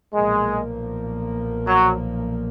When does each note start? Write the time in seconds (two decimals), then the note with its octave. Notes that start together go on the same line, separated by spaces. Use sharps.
0.13 B1 A#2 F3 G#3 A#3
1.66 F#3